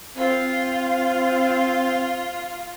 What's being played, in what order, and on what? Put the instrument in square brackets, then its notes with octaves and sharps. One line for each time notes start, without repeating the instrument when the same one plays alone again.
[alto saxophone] C4 [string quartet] F4